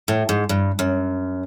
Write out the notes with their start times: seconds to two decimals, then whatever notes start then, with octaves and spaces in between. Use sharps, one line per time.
0.08 A2
0.29 G#2
0.49 G2
0.79 F#2